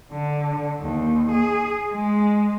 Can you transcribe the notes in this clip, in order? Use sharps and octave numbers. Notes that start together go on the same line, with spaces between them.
D3
D#2
G#4
G#3